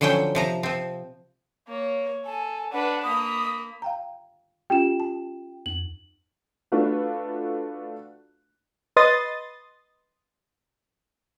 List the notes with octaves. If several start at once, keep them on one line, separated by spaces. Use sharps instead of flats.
D3 F3 F#3 C#4 G5
C3 F3 A#5
F3 C4
A#3 C#5
A4 G#5
D4 B4 F#5
A#3 B5 D#6
F5 G5 A#5
C#4 F4 G4 G5 E7
A5
F2 F#7
A3 D4 F4 F#4 B4
B4 D#5 C6 D#6 A6